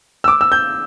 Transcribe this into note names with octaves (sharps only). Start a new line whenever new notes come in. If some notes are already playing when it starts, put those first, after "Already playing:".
E6
D6
E6
G6